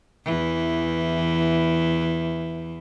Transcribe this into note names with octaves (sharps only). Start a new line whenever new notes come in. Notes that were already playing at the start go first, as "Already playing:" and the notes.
E2 E3